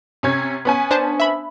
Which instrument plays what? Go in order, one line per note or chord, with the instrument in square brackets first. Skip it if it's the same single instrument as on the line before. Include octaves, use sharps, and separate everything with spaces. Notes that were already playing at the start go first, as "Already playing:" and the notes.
[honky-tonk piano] C3 C#4 G#6
B3 C#4 G#5
[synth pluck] D4 C5 A5
E5 B5